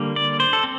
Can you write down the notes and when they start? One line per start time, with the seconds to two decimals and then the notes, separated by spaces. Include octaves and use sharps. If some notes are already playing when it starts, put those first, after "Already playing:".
Already playing: D3 G3 A#3
0.16 D5
0.40 C5
0.53 A4
0.64 C4